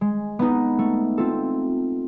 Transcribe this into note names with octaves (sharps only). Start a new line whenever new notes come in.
G#3
B3 D#4
A3
C4 F4 A4